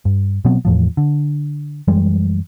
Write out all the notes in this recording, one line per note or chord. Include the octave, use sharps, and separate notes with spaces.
G2
B2 F#3 B3 C4
E2 A2 F3
D3
F#2 E3 G3 G#3